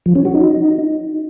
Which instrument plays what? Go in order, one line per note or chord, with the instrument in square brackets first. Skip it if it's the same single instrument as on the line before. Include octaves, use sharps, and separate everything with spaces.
[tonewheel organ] F3
C#4
F#4
D#4